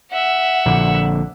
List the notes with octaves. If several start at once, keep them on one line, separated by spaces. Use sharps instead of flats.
E5 F#5
A#1 D3